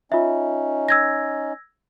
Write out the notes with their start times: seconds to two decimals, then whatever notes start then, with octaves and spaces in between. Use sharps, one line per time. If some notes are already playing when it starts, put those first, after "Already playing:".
0.12 C#4 D#4 F4 E5
0.89 E6 G#6 A#6